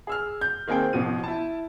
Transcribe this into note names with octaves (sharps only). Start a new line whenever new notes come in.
G#4 E6 F6
G6
D#3 A#3 C4 G#4 G5
A1 B2 F3 D#7
E4 A5